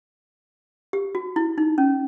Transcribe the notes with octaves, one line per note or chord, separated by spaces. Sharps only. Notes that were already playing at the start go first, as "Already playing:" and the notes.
G4
F#4
E4
D#4
C#4